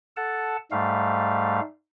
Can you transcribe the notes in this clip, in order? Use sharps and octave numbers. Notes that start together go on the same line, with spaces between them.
A4 F#5 A5
G#2 G3 A3 F5